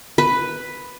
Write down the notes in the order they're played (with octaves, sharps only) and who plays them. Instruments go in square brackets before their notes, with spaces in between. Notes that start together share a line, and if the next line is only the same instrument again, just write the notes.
[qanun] B4